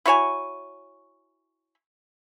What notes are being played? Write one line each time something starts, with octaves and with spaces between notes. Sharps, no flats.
E4 F#4 C#5 G#5